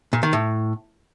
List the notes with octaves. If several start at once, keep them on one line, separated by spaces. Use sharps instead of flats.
A#2
D#3
A2